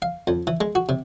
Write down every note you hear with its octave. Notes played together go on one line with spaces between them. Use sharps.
F5
F2
E3
G#3
F#4
C3